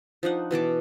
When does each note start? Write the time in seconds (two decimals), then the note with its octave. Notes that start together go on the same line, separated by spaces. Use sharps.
0.23 F3 D4 D#4 F#5
0.51 B2 E3 A5 D6